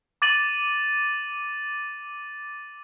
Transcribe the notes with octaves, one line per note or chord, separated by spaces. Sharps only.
D6 A6 D#7 F#7